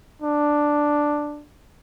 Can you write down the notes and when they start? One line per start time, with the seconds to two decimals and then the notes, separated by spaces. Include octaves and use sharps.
0.22 D4